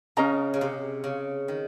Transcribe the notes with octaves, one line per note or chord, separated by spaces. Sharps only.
C#3 C#4 G#4 D#5 A#5
C#3
C3
C#3
D#3